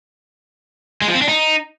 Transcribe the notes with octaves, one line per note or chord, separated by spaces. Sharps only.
G#3
F3
C4
D4
D#4